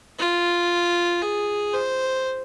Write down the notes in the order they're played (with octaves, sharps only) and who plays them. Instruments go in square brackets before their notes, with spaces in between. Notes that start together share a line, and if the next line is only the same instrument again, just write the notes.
[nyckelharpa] F4
G#4
C5